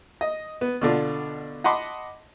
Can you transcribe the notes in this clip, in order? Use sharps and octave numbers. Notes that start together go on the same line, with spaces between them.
D#5
B3
B2 D3 D4 F4
D#5 F#5 A5 B5 C6 D6